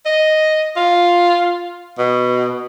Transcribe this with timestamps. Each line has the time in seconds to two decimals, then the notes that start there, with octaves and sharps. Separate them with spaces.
0.05 D#5
0.76 F4
1.98 B2